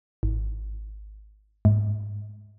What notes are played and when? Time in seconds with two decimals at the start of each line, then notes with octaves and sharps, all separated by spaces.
0.23 G#1
1.65 G#2